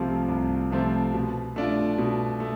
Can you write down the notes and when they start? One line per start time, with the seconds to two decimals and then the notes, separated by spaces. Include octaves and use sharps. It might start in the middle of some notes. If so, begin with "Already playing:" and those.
Already playing: C2 C3 F3 A3 C4
0.29 C2
0.71 C3 F3 A3 C4
1.13 B2
1.56 A3 D4 F4
1.98 B2
2.40 A3